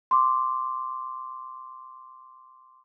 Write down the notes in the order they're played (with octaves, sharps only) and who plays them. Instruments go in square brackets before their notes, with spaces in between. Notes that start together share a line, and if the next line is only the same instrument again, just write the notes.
[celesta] C6 D6